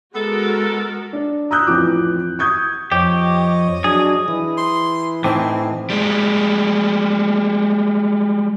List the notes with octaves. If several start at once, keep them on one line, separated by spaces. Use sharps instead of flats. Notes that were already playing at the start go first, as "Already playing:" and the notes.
G#3 B3 F#4 A4 A#4
D4
A#5 D#6 E6 F#6 G6
A1 F2 E3 F3 D6
C#6 D#6 G6 G#6
F2 G4 C#5 D#5
F#3 D4 G#4
E3
C6
A2 E3 C4 D#4
G3 G#3